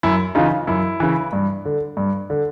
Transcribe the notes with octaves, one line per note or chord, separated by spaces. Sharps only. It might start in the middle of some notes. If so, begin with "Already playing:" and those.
F#2 E4
C#3 E3 D#4 F4
F#2 E4
C#3 E3
G2
D3
G2
D3